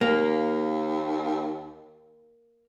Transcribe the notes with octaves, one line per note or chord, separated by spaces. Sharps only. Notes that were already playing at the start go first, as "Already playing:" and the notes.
D#2 A#3